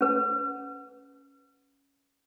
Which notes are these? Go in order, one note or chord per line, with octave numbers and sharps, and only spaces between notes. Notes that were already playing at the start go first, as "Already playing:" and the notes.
C#4 B4